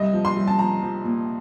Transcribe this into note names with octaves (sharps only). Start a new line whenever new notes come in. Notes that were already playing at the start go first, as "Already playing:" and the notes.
Already playing: C2 D#5
F3
C6
C2
A5
F3 A#5
F3
A#2